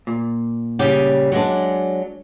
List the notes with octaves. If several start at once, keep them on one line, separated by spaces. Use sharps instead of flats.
A#2
C#3 G3 G4
F#3 G#3 D4